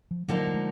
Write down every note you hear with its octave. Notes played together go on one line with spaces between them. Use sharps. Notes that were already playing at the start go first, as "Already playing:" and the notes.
F3
D3 F3 F#3 A#3 D#4
G3
G#3